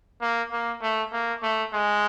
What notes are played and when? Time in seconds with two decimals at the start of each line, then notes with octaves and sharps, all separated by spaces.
0.22 A#3
0.52 A#3
0.82 A3
1.13 A#3
1.43 A3
1.73 G#3